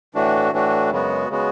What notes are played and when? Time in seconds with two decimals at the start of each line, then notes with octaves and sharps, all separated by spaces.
0.15 A2 E3 A3 D4 F#4
0.52 A2 E3 A3 D4 F#4
0.91 F#2 C#3 G#3 B3 F#4
1.30 C#3 G#3 B3 F#4